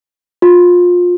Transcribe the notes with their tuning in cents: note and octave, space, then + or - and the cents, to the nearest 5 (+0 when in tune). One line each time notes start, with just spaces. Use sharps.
F4 +25